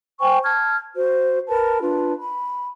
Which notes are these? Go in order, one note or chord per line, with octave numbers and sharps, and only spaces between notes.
C5 G5 G#5 C#6
A5 F6 G#6
F#4 C5
A#4 B4 A5 B5
D4 F4 B4
B5